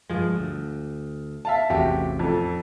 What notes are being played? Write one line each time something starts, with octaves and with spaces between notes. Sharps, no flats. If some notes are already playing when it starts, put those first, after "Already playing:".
G2 F3 G#3
D2
E5 F5 A5
A1 E2 C3 F#4 G4 E5
F2 A4